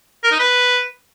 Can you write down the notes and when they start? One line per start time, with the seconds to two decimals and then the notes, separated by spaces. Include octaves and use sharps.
0.24 A#4
0.31 D#4
0.39 B4